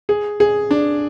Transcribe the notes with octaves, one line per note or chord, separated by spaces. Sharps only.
G#4
G#4
D4